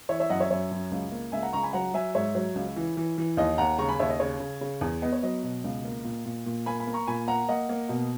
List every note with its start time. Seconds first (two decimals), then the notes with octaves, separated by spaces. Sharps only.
0.09 E3 C#5 E5
0.20 C#5 E5
0.30 F#2 D#5 F#5
0.40 C#5 E5
0.50 F#2 C#5 E5
0.71 F#2
0.91 C#2
1.12 A#3
1.32 C#2 E5 G#5
1.43 F#5 A#5
1.53 C#2 A#5 C#6
1.63 G#5 B5
1.73 F#3 F#5 A#5
1.94 F#3 E5 G#5
2.15 G#2 C#5 E5
2.35 F#3
2.55 C#2
2.76 E3
2.97 E3
3.18 E3
3.37 D#2 D#5
3.58 D#2 F#5 A#5
3.78 C#3 A#5 C#6
3.89 G#5 B5
3.99 D#2 C#5 E5
4.10 D#5
4.20 C#3 C#5
4.40 C#3
4.61 C#3
4.81 E2
5.02 B3 D#5
5.13 C#5
5.23 F#3 D#5
5.43 B2
5.64 C#2
5.85 A#3
6.04 A#2
6.26 A#2
6.46 A#2
6.66 A#3 G#5 B5
6.80 G#5 B5
6.87 A#3
6.93 A#5 C#6
7.07 A#2 G#5 B5
7.28 A#3 F#5 A#5
7.48 A#3 D#5 F#5
7.69 A#3
7.89 B2